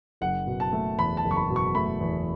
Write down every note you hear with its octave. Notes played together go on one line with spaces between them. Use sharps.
F#1 F#5
B2
A5
A3
E2 B5
A5
F#1
C#6
B5
B2
C#6
A3 B5
E2